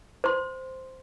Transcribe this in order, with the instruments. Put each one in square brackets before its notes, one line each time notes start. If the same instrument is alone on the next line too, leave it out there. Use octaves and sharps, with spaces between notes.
[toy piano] C5 C6